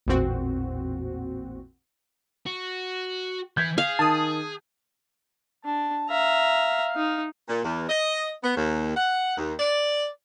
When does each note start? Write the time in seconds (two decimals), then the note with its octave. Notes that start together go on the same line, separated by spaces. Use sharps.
0.07 A1 E2 A#2 C4 F#4
2.46 F#4
3.57 E3 G6 G#6 B6
3.78 G#4 F5
3.99 D#3 A5 D#6
5.65 D4 A5
6.10 E5 F5 A#5
6.96 D#4
7.49 A#2
7.64 E2
7.89 D#5
8.43 B3
8.56 D#2
8.96 F#5
9.37 D#2
9.60 D5